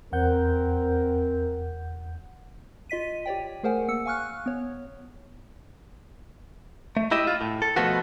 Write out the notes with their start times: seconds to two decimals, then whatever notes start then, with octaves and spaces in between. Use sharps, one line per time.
0.12 E2 C4 A#4 F#5 G6
2.90 F4 D#5 B6 D#7
3.26 G4 C#5 D5 G5
3.63 A3 G#4 A#4 C5 F#5 G#5
3.88 A#3 E6 C#7
4.06 F5 G#5 C#6 F6 F#6
4.46 B3 C#5
6.97 A3
7.11 E4 G4 D#5 E5
7.27 F4
7.41 A2
7.62 A4
7.76 B2 F3 A3 B3 F#4